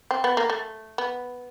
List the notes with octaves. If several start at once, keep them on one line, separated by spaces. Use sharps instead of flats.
C4
B3
A#3
A3
B3